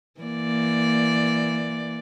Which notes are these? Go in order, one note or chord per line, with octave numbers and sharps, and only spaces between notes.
E3 A#3 D5